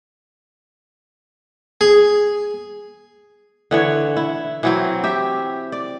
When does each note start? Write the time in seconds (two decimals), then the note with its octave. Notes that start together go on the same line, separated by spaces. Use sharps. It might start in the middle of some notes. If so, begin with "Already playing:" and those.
1.81 G#4
3.71 D3 E3 C#5
4.16 E4
4.63 E3 F#3 C4
5.04 G4 E5
5.72 D5